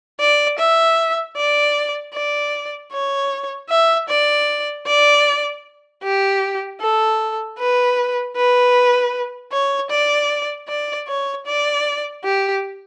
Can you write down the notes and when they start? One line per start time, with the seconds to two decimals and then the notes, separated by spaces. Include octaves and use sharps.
0.20 D5
0.59 E5
1.37 D5
2.14 D5
2.92 C#5
3.70 E5
4.09 D5
4.87 D5
6.03 G4
6.80 A4
7.58 B4
8.36 B4
9.52 C#5
9.91 D5
10.68 D5
11.07 C#5
11.46 D5
12.24 G4